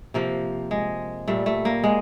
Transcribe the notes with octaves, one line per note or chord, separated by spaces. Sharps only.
C3 F3 A#3
G#3
A#2 G3 A3
A3
A#3
G#3